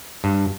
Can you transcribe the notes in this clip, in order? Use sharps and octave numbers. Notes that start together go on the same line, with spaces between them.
G2